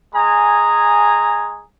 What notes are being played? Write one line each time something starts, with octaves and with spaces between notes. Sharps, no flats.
G#3 G#4 G#5 A#5